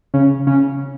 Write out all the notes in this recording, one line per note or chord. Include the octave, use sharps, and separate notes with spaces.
C#3 C#4
C#3 C#4